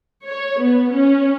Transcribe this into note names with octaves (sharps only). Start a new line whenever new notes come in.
C#5
B3
C#4